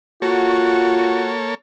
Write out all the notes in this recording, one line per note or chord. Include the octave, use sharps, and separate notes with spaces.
A#3 F4 F#4 A4 C#5